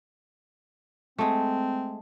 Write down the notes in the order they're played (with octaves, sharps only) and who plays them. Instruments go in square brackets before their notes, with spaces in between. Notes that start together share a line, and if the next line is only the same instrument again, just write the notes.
[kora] G#3 A3 [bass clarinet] C4